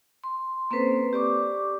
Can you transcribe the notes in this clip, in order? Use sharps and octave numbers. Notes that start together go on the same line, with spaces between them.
C6
A#3 C4 C#4 A4 B4 C5
G4 D5 C#6 D6